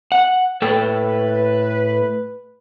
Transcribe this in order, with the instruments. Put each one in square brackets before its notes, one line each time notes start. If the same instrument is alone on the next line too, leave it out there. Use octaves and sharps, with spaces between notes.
[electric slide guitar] F#5
[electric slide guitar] A2 A4 G5 [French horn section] B4